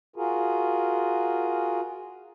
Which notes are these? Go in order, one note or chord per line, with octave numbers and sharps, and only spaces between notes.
F4 F#4 G#4 A#4